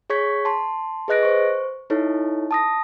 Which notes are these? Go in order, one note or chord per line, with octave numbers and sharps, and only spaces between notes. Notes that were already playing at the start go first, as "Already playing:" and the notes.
G#4 C#5 C#6 G#6 B6
A5 C6
G#4 B4 D#5 F#6 A#6 D7
C5 C#6
D#4 E4 A4 C#5
A5 D#6 A#6